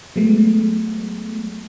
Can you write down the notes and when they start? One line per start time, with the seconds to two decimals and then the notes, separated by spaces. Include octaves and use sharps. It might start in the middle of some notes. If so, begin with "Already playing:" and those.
0.16 F#3 G#3 A3 B3